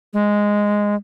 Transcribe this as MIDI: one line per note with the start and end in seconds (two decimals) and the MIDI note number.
0.13 0.95 56